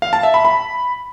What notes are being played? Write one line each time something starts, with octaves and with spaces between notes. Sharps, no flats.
F5
A5
E5
B5
B5